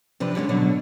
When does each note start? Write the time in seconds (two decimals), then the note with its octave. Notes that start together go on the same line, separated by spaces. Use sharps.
0.20 C3 F3 D4 B4
0.35 D3 G3 G#3 C#4
0.49 B2 D3 F#3